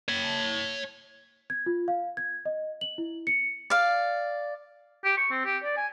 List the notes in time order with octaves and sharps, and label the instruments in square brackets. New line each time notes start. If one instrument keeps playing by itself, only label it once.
[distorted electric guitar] C#5 A5
[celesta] G#6
F4
F5
G#6
D#5
F#7
E4
C#7
[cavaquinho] D5 F5
[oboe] G4
C#6
C4
G4
D5
G#5